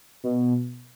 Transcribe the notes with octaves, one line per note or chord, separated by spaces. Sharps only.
B2